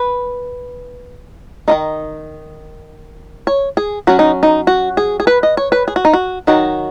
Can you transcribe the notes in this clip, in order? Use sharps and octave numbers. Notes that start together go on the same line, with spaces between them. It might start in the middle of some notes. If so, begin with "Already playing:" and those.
Already playing: B4
D#3 F#3 D#4 D#5
C#5
G#4
F#3 C#4 F#4
D#4
D#4
F#4
G#4
G#4
B4
D#5
C#5
B4
G#4
F#4
D#4
F#4
D#3 F#3 D#4 F#4